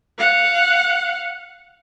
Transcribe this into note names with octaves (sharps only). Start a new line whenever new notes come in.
F5 F#5